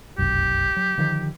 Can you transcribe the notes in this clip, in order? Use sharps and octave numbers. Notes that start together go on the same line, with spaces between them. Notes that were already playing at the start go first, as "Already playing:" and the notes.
F1 B1 F#2 G4
F#3
D3 D#3 F3